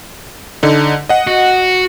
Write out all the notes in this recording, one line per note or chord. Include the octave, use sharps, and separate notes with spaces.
D3 D#4
D#5 F#5
F#4